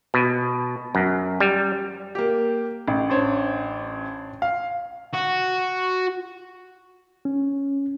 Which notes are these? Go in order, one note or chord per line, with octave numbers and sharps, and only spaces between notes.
B2
F#2
G3
A#3 G4
A1
D4 C5 C#5
F5
F#4
C#4